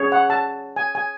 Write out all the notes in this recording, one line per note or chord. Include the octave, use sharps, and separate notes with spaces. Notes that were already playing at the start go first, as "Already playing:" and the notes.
Already playing: C#4 G#4 C#5
F#5
A5
G#5
G#5